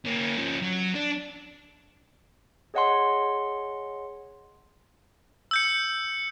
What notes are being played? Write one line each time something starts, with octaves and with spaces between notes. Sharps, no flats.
A#3 C#4
F3 C#4
F#3
D4
G#4 C#5 D#5 F#5 G#5 C6
E6 G6 C#7